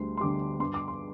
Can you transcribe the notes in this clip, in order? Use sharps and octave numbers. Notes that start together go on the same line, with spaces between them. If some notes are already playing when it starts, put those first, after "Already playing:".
Already playing: D2 G3 C6
C6
D3 G3 D6
G2 C6
D6
C6